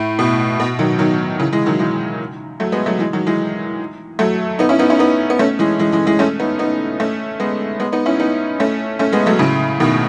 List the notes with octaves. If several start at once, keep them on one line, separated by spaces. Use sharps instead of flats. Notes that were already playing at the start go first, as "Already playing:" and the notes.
Already playing: A2
B2
B2
D#3 F#3
D#3 F#3
C#3 E3
E3 G#3
D#3 F#3
E3 G#3
F#3 A3
G#3 B3
F#3 A3
E3 G#3
D#3 F#3
E3 G#3
F#3 A3
B3 D#4
C#4 E4
B3 D#4
C#4 E4
B3 D#4
B3
A3 C#4
E3 G#3
E3 G#3
E3 G#3
E3 G#3
A3 C#4
B3 D#4
B3 D#4
A3 C#4
G#3 B3
G#3 B3
B3 D#4
C#4 E4
B3 D#4
A3 C#4
A3 C#4
G#3 B3
F#3 A3
A2 C#3
B2 D#3